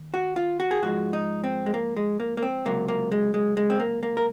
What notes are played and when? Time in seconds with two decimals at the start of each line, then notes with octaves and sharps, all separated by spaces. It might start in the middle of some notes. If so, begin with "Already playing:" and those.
Already playing: D#2
0.14 F#4
0.36 F4
0.60 F#4
0.71 G#4
0.82 G#2 F3 G#3 F#4
1.13 D#4
1.44 C4
1.66 G#3
1.74 A#3
1.96 G#3
2.20 A#3
2.37 A#3
2.42 C4
2.65 C#2 C3 F#3 A#3
2.88 A#3
3.12 G#3
3.34 G#3
3.57 G#3
3.70 C4
3.80 A#3
4.03 A#3
4.17 A#4